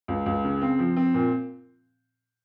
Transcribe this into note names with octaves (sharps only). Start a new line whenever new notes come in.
C#2
C#2
C#3
C4
F3
C4
A#2